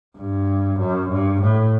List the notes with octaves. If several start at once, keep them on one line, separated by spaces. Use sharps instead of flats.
G2
F#2
G2
A2